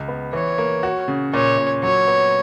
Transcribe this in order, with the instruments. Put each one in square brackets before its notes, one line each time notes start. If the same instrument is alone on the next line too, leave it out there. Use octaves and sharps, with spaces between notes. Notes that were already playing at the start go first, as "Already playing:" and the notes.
Already playing: [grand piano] C#2
B3
[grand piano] E3 [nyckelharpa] C#5
[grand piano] A#3
F#4
C#3
[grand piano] A#2 [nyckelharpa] C#5
[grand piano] A#2
[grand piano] F#3 [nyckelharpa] C#5
[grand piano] B3